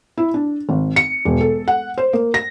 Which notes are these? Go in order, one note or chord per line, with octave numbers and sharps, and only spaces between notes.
E4
D4
G#1
C#7
E1
A4
F#5
C5
A#3
A#6